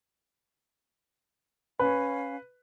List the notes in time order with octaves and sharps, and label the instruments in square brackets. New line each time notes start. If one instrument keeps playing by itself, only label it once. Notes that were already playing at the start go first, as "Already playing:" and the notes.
[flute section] C#4 F5 [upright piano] B4